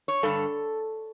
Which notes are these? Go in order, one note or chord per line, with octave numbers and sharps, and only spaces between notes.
C#5
G2 D3 A4